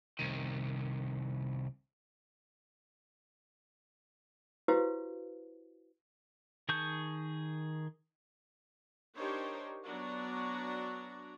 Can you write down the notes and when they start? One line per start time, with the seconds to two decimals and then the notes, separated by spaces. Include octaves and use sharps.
0.19 C2 D#3
4.68 E4 F#4 G4 B4 C5 F5
6.69 D#3 G#4 A5 C#6 G6
9.16 D4 D#4 G4 A#4 C5 C#5
9.84 F#3 B3 D4 F#4 D5 A#5